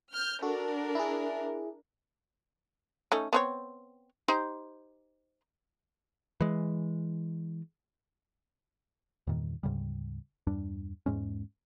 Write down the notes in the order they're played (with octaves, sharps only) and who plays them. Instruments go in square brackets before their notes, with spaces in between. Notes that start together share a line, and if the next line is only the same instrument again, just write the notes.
[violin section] F6 G6
[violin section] D4 A#4 [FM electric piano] F#4 A4
[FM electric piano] E4 G#4
[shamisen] A3 C#4 D#4
B3 C4 C#5
D#4 G4 C5
[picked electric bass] E3 G#3
E2 G2 A#2 D#3
D2 G#2 C#3 G3
E2 G2 G3 D4
E2 G#2 G#3 C#4